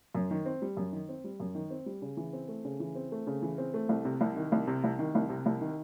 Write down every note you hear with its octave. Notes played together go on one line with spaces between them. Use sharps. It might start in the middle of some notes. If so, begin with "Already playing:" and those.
F#2
D#3
C4
G3
F#2
D#3
C4
G3
F#2
D#3
C4
G3
C#3
E3
C4
A3
C#3
E3
C4
A3
C#3
E3
C4
A3
C2
C3
C2
D#3
C2
C3
C2
D#3
C2
C3
C2
D#3